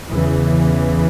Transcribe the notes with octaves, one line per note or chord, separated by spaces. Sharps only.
E2 C#3 E3